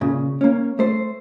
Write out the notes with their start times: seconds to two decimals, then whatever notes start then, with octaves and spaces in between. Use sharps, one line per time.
0.01 A#2 C#3
0.41 A#3 C#4
0.79 A3 C5